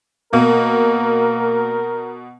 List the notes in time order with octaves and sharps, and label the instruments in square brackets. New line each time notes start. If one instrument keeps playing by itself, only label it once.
[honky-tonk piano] B2 [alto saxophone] A#3 [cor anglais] A#4